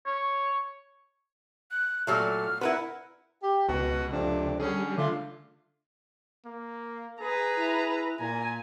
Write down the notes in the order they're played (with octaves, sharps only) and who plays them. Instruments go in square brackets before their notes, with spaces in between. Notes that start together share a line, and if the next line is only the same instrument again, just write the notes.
[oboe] C#5
[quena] F#6
[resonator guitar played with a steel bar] A#2 F#3 A3 [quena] F6
[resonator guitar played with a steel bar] E4 A#4 B4 [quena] F#5
[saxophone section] G4
[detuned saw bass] C#2 [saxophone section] B2 F#4 B4
[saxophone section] F2 C3 D4
[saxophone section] D3 C#4 G#4 [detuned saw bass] G3
[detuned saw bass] D3 [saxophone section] A3 D4 F4
[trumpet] A#3
[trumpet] G#4 [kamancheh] B4 A#5
[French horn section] E4
[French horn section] A#2 [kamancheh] G#5 [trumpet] A#5